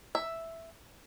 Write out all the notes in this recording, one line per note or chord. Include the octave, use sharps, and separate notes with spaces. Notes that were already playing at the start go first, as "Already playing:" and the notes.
E5